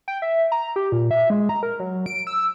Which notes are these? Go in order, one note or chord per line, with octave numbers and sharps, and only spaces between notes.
G5
E5
A#5
G4
A#2
E5
G#3
A#5
A#4
F#3
D7
E6